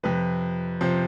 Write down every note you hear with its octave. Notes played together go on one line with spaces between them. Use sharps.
F2 C3 F3 B4
C3 F3 C5